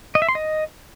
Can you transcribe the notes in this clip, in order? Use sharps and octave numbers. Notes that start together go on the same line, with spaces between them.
D#5
E5
C6
D#5